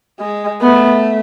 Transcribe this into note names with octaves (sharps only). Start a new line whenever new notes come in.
G#3
A3 B3